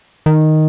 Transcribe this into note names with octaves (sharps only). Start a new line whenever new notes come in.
D#3